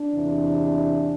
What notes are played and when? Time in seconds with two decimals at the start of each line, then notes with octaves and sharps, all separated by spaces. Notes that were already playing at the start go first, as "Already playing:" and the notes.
Already playing: D4
0.12 E2 C3 E3